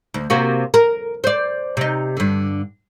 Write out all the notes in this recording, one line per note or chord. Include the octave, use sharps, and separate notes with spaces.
D2
C3 A#3 F#4
A#4
C5 D5
C3 D#4
G2 D3